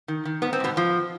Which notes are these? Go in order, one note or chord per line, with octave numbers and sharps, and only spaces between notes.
D#3
D#3
G#2 B3
C4
G#2 B2 B3
G#2 F3